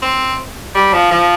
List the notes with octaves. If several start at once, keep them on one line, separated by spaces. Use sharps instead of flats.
C4
G3
F3
F3